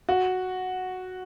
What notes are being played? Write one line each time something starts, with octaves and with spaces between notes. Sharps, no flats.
F#4